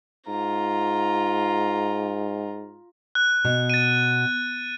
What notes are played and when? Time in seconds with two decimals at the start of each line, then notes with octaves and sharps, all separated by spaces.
0.27 G#2 F4 A#5
3.15 F#6
3.45 B2
3.70 A6 D#7